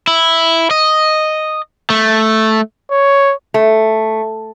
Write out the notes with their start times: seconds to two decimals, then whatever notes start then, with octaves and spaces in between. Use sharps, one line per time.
0.07 E4
0.71 D#5
1.90 A3
2.91 C#5
3.54 A3